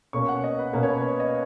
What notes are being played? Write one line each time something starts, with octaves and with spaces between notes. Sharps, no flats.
B2 A#3 C#4 C#6
F#5
D#5
B4
B2 A#3 C#4 A#4
C#5
B4
D#5